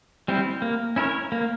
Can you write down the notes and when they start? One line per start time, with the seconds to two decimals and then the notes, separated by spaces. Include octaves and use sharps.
0.28 G3 C4 E4
0.62 A#3
0.96 C#4 E4 A#4 C#5
1.32 A#3